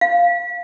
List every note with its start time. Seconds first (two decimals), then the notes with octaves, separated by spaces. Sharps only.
0.01 F5